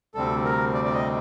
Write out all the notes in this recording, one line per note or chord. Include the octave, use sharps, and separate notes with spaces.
D2 C3 G3 C4 A4
A#4
D5
D5
D#5